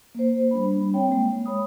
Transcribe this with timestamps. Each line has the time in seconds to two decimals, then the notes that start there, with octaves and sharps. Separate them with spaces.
0.15 A#3 C5
0.51 G3 D4 B5
0.93 C4 C#5 G5
1.08 G#3 A#3
1.46 C#5 B5 D#6